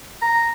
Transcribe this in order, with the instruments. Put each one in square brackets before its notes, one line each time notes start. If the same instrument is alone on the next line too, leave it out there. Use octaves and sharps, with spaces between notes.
[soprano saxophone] A#5